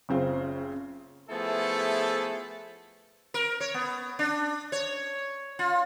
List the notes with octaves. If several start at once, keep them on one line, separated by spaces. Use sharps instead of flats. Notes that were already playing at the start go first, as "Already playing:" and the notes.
F#1 C#3 C4 F4
F3 A3 B3 E4 G#4 A4
A#4
C#5
B3
D4
C#5
F4